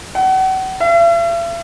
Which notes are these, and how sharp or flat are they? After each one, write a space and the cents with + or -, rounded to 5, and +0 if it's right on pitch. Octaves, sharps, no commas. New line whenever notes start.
F#5 +35
E5 +45